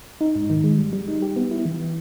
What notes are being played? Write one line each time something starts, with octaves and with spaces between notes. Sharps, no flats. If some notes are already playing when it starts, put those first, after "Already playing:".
D#4
G#2
D#3
G#3
G3
G3
D#4
G4
B3
E4
E3